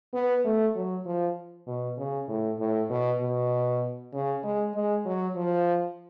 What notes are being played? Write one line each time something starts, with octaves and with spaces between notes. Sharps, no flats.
B3
A3
F#3
F3
B2
C#3
A2
A2
B2
B2
C#3
G#3
G#3
F#3
F3